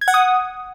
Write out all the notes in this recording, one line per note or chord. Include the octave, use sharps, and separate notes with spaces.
G#6
F#5
D#6